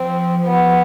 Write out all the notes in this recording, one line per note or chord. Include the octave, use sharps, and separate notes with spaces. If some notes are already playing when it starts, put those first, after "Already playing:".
Already playing: F3 C4
B3